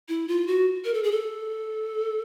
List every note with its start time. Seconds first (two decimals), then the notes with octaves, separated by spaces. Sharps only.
0.09 E4
0.28 F4
0.47 F#4
0.85 A#4
0.94 A4
1.03 G#4
1.12 A4